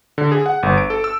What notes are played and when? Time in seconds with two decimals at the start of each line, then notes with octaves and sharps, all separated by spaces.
0.18 D3
0.32 G#4
0.46 F#5
0.63 G1
0.78 D7
0.90 A4
1.04 E6